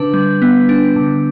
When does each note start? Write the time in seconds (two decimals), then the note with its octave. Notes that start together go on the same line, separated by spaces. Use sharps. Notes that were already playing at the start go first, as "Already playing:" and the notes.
Already playing: D3 D4 B4
0.14 G3
0.42 B3
0.69 D4
0.96 D3